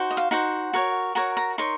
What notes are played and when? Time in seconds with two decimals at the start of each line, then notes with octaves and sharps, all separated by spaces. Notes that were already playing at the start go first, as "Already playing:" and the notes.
Already playing: D#4 F#4 C5
0.11 D#5
0.17 F5
0.31 D#4 F#4 C5 F#5
0.73 F#4 A#4 C#5
1.15 F#4 A#4 C#5 A#5
1.37 A#5
1.58 D#4 A#4 C#5 C6